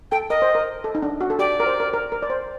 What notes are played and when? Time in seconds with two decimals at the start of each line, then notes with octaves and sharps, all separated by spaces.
0.11 A4 G5
0.30 A#4 D#5
0.42 C5
0.55 A#4
0.84 A4
0.95 D#4
1.03 D4
1.21 F#4
1.30 A4
1.39 G4 D5
1.60 A#4
1.66 C5
1.80 A#4
1.93 A#4
2.12 A#4
2.22 D5
2.30 C5